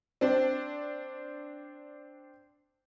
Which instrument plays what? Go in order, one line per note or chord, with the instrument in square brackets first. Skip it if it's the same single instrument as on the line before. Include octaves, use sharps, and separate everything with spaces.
[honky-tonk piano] C4 D4